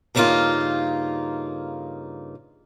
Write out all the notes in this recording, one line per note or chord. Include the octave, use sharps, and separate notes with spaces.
G2 C#3 A#3 B3 D#4 F4